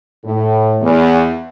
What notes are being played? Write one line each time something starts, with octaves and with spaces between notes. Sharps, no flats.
A2
E2